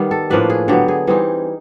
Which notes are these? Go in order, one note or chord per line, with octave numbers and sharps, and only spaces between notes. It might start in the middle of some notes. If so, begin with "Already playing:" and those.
Already playing: D#3 G3 B3
A4
A2 F3 A#3 D4 B4
G#4
D3 F#3 B3 G4
G#4
E3 G3 C4 D#4